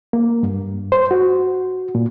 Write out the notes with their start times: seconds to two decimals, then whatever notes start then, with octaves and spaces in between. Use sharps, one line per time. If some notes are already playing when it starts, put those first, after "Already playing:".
0.13 A#3
0.43 G2
0.92 C5
1.11 F#4
1.95 A#2